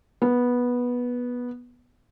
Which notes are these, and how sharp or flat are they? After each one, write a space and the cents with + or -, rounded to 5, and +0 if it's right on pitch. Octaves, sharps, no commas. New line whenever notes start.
B3 -10